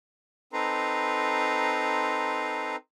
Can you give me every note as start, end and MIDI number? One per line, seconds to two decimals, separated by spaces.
0.53 2.76 60
0.53 2.76 63
0.53 2.76 69
0.53 2.76 71
0.53 2.76 82
0.53 2.76 84